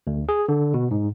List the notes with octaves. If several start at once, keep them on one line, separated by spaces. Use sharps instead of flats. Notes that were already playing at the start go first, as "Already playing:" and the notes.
D2
G#4
D3
B2
G#2